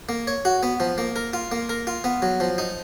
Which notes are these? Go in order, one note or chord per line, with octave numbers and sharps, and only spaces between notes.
A#3
C#5
F#4
B3
F3
A#3
A#4
F4
A#3
A#4
F4
B3
F#3
F3
D#4